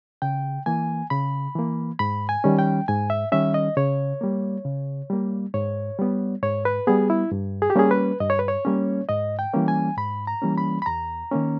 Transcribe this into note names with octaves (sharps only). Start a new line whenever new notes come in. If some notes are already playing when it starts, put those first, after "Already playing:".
C#3 G5
E3 A#3 G#5
C#3 B5
E3 A#3
G#2 B5
G#5
D#3 G3 C#4
G5
G#2 G#5
E5
D#3 G3 C#4 E5
D#5
C#3 C#5
G3 A#3
C#3
G3 A#3
G#2 C#5
G3 B3
G#2 C#5
B4
G3 B3 G#4
E4
G2
G#4
G4
G3 A#3 C#4 G#4
B4
G2 D#5
C#5
B4
C#5
G3 A#3 C#4
G#2 D#5
G5
E3 G3 A#3 C#4
G#5
G#2 B5
A#5
E3 G3 A#3 C#4
B5
B5
E2 A#5
D#3 A#3 C#4